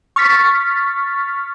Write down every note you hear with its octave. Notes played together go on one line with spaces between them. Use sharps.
C#6 F6 A6 B6